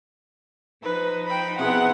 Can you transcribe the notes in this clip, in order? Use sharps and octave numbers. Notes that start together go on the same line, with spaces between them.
F3 D#4 B4
G5 B5
C3 B3 E4 G#4 F#5